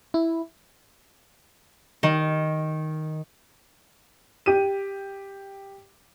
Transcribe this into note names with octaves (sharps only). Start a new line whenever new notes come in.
E4
D#3
G4 D#7